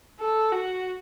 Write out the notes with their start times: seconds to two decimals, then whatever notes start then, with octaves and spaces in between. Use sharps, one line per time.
0.20 A4
0.52 F#4